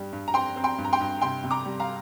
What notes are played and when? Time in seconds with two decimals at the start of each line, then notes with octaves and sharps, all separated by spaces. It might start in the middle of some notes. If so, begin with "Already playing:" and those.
Already playing: G2 G3
0.13 G2
0.28 A#5
0.34 C4 G5 C6
0.56 C4
0.64 G5 C6
0.78 G2
0.85 A#5
0.93 G5 C6
1.00 G2
1.22 C3 G5 C6
1.44 C3
1.51 A#5 D6
1.66 G3
1.80 F5 A#5